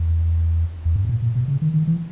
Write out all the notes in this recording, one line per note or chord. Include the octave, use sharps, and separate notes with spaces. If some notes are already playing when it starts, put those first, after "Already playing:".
Already playing: E2
E2
G2
G#2
A#2
A#2
B2
C#3
D#3
D#3
E3